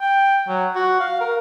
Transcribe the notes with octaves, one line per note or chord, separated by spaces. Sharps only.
G5
F#3
F#4
F5
A#4